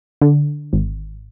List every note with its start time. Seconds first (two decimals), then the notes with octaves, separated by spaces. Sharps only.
0.22 D3
0.73 G#1